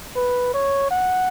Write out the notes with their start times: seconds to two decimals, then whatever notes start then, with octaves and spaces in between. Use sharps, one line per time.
0.16 B4
0.54 C#5
0.91 F#5